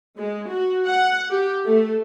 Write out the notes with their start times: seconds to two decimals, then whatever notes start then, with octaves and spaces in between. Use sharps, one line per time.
0.17 G#3
0.49 F#4
0.86 F#5
1.29 G4
1.65 A3